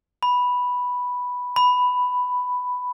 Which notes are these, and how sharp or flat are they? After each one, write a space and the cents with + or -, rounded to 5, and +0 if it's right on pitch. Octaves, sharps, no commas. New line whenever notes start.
B5 +0
B5 +10